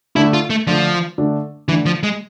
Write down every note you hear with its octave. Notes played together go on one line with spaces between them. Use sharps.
D3 A3 D4 E4
F4
A3
D3 F3 A3 D4
D3 A3 D4
D3 E3 A3 D4
F3
G#3